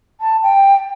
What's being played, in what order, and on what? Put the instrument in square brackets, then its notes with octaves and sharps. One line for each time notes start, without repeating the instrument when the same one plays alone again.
[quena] A5
G5